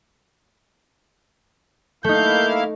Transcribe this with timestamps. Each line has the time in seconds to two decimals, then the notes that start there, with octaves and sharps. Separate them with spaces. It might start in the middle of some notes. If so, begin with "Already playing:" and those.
2.04 A3 A#3 D#4 E4 F5 G6